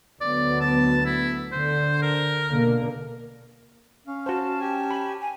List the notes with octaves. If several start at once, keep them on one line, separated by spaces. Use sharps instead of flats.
D2 F#3 B3 D5
A5
E4
D3 C5
A#4
B2 D3 A#3
C#4 F5
F#4 C5 A5
G4 G#5
B5
G#5